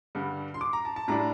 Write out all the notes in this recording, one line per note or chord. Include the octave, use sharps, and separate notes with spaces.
G2 D3 G3
C6
D6
A#5
A5
A5
A2 G3 D4 A#5